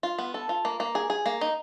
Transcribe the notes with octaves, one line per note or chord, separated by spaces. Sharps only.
F4
B3
A4
F4
A#3
A#3
G#4
G#4
A#3
D#4